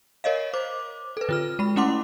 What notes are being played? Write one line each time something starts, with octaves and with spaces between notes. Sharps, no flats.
A#4 C#5 D#5 F5
C5 D6
A4 B4
D3 F4 F6
G#3 B5
A3 C#4 E4 F#5 C6 D6